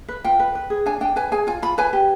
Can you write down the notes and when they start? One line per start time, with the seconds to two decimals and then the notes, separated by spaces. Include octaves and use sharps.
0.08 B4
0.24 F4 G5
0.39 B4
0.55 B4
0.70 G#4
0.86 D4 G#5
1.01 D4 G5
1.16 B4 G#5
1.32 G#4 G#5
1.47 F4 G#5
1.62 F4 B5
1.78 B4 G#5
1.93 G4